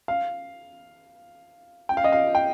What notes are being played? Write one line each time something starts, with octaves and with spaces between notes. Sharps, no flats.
F5
G5
F5
D#5
F5
G5